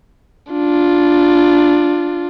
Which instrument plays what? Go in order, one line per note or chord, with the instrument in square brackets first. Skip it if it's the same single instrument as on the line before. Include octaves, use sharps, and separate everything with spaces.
[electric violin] D4 F4